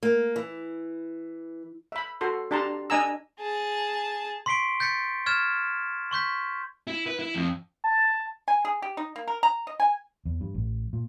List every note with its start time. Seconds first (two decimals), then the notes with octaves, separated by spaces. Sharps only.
0.03 A#3
0.36 E3
1.92 E5 B5
2.21 F#4 A4 C6
2.51 D4 G4 A5 A#5 C6
2.90 D4 D#5 G#5 A#5 E6
3.40 G#4 A5
4.46 C6 C#6 B6 C7 D7 G7
4.80 G6 A6 B6 C#7
5.26 C#6 F6 G#6 A6 E7
6.11 C6 C#6 G6 B6
6.87 E4
7.06 B4
7.19 E4
7.35 F2
7.84 A5
8.48 G#5
8.65 G#4
8.82 G4
8.97 D#4
9.16 A#3
9.28 A#4
9.43 A#5
9.67 D#5
9.80 G#5
10.25 E2
10.41 G2
10.55 A1
10.93 A#2